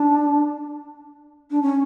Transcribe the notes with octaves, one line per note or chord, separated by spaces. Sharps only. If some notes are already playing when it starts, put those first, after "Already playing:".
Already playing: D4
D4
C#4